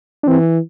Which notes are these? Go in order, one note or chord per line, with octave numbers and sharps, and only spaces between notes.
D4
E3 C4